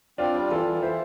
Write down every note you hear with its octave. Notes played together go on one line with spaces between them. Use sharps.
C4 D4 F4
G3
E3 F4 A4
E3
E3 C5 E5